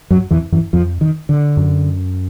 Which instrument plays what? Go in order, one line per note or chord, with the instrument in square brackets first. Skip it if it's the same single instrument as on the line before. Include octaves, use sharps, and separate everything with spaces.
[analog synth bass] F#2 [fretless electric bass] F#3
[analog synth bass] F2 [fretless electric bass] E3
[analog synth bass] F#2 [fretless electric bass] E3
[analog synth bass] F2 [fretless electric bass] F3
[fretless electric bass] D#3
D3
[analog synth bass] F#2